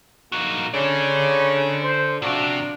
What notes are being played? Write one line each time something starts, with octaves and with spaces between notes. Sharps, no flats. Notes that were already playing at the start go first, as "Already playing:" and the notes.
A#3 D#4 F#4
C#3 A4 C#5 D5
C5
C3 F3 D4 F#4